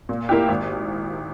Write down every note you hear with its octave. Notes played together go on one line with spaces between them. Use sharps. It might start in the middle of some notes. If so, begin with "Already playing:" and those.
A#2
A#3 E4 G4
G#1